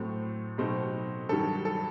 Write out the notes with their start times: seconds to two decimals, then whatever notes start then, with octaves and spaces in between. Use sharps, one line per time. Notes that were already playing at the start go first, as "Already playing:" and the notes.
Already playing: A2 F#3 A3 C4
0.58 B2 F#3 A3 C4 D#4
1.29 G2 D#3 F#3 A4
1.65 A4